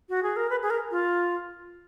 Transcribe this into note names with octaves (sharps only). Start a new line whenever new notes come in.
F#4
G#4
A#4
B4
G#4
A#4
F4